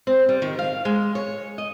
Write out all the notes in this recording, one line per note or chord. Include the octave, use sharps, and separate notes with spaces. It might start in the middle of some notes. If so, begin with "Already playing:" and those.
C4
G3
D#3
F5
G#3
C#5
D#5